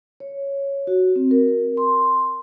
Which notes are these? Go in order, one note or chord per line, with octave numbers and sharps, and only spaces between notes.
C#5
F#4
C4
A#4
C6